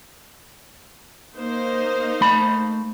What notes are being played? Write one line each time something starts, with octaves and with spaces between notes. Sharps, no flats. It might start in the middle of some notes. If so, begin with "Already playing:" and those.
A#3 D#4 C5
A3 B5